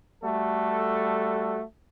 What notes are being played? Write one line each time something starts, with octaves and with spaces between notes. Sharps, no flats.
G3 A3 F#4 A4